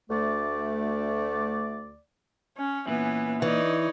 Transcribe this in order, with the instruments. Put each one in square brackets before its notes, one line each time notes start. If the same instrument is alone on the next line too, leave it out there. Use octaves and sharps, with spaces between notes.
[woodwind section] D2 A3 D5
[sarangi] C#4
[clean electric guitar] A#2 [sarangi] E3 [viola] B3 C#4
[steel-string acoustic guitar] E3 [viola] D#4 D5 [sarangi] C#5